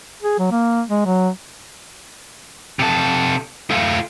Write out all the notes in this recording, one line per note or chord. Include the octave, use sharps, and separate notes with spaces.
G#4
F#3
A#3
G#3
F#3
C3 A4
A3 F4